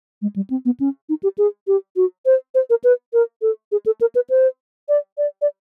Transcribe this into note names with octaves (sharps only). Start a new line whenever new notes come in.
G#3
G3
C4
B3
C#4
D#4
G4
G#4
G4
F#4
C5
C5
A#4
B4
A#4
A4
G#4
A4
A#4
B4
C5
D5
D5
D5